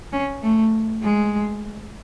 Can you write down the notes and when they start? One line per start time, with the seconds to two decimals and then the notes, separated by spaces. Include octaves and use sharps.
0.12 C#4
0.42 A3
1.02 G#3